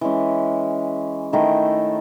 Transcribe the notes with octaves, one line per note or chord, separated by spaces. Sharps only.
E3 G#3 C#4
D#3 A3 E4 A4